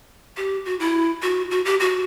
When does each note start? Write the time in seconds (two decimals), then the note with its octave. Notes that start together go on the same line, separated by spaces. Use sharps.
0.37 G4
0.65 F#4
0.80 E4
1.22 F#4
1.51 F#4
1.65 G4
1.80 F#4